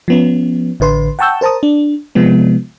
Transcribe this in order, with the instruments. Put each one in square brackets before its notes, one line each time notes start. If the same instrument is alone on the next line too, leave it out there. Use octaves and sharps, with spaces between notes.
[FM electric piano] F3 B3 C#4
A1 D3 B4 C6
F#5 G5 A5 C#6 E6 G6
A#4 C5 A5 A#5 D#6
D4
C3 F3 G#3 B3